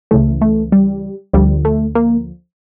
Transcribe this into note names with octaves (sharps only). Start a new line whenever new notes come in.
C#2 C#3 E3 A3
A3
G3
D2 D3 F3 G3
A3
A#3